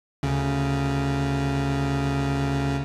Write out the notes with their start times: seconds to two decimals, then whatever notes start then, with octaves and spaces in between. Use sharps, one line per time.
0.23 D2 C#3